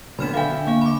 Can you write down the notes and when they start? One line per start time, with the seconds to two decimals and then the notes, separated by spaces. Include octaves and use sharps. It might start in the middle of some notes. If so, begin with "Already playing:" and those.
0.19 B1 D3 B3 B5 F6 E7
0.34 D3 E5 F5 G5 G#5
0.67 A#3 F5 G#5
0.81 B5 D6